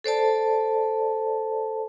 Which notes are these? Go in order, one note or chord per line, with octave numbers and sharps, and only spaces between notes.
A4 C5 D5 A5